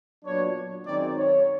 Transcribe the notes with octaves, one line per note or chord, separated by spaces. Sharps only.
A#2 F#3 B3 D4 C#5
F#2 D#3 G#3 C4 D#4 D5
C#5